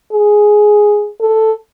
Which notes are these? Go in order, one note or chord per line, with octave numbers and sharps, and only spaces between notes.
G#4
A4